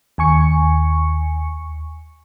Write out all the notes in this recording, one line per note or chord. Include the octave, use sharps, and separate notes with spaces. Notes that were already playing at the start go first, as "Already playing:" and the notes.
D#2 G#5 C#6 C#7